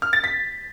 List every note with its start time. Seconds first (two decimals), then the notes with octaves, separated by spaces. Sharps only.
0.02 F6
0.13 A6
0.24 B6